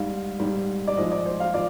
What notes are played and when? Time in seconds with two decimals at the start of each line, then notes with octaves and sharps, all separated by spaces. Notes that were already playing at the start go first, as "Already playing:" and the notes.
Already playing: G#2 G3 F5
0.39 G#2 G3
0.87 D5
0.97 G#2 F3 G#3 D#5
1.12 D5
1.26 C5
1.40 F5
1.54 F3 D5